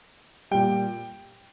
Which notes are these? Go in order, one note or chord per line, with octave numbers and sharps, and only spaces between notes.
A#2 G3 G5